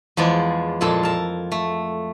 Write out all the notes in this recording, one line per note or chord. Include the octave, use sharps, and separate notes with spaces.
E2 F3 G#3 D5
F2 A#2 G#3 A4 A5
A#4 A5
A3